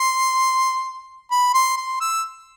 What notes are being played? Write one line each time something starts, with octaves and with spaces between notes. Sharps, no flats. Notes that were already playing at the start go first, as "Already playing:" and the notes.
Already playing: C6
B5
C6
C6
E6